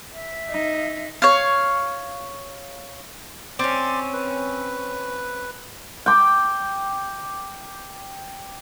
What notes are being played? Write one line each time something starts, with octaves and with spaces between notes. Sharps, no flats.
E5
D#4
C#5 F5
C4 C#4 D5 C6 D6
B4
G5 D6